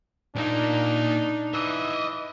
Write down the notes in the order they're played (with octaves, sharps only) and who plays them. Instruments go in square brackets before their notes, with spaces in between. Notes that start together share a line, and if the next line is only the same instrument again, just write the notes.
[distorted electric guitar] A#2 A#3 [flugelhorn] D4 [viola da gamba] D#4
[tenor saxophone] E3 [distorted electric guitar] D#5 E5